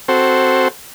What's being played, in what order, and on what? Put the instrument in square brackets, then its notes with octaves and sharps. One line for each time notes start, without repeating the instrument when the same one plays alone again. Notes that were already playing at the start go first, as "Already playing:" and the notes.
[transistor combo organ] C4 F#4 A4 C5